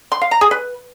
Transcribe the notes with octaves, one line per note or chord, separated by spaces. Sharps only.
C6
F5
A#5
G#4
B4